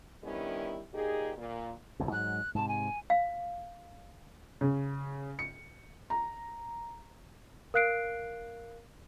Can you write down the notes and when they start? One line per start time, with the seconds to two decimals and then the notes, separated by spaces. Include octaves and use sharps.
0.23 D#3 G3 B3 C#4 D4 E4
0.94 A#2 D#4 G4 G#4
1.37 A#2
2.00 G1 C2 F2
2.12 G#2 F#3 F#6
2.55 G#2 C3 A5
2.68 G#5
3.10 F5
4.61 C#3
5.39 C#7
6.10 A#5
7.74 A#4 F5 F#6 C7 D7